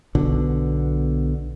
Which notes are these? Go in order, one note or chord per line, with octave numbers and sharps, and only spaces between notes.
B1 B2 D3